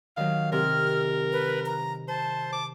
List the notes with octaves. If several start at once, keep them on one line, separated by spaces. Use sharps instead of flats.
D#3 F#3 F5
C3 A#4 F6
B4
A#5
C5 A5
D6